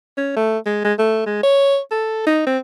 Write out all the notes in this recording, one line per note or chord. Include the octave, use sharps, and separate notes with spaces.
C#4
A3
G#3
G#3
A3
G#3
C#5
A4
D#4
C4